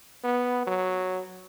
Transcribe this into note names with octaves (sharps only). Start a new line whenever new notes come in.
B3
F#3